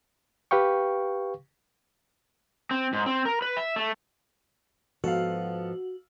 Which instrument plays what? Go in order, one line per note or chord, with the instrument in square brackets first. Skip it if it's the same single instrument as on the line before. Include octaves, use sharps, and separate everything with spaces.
[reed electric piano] G4 B4 F5 G5 C#6
[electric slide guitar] C4
G#2
C4
A#4
B4
E5
A3
[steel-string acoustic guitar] G#2 F3 B3 [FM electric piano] F#4 [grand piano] A4 F5